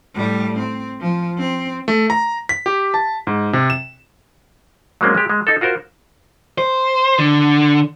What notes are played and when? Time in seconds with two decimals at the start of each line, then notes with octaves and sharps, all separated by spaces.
0.15 A2 G3
0.58 C4
1.00 F3
1.39 C4
1.88 A3
2.10 A#5
2.49 B6
2.66 G4
2.94 A5
3.27 G#2
3.53 C3
3.70 E7
5.01 F#3 G#3 A#3 C4 C#4
5.15 G#3 G4
5.29 G#3
5.47 D#4 A4
5.61 F4 F#4 A#4 C5
6.58 C5
7.18 D3